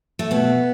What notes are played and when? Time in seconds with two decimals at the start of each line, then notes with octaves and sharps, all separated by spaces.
0.19 A3
0.31 B2 B3